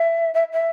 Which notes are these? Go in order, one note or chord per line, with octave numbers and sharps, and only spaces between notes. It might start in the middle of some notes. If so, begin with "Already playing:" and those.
Already playing: E5
E5
E5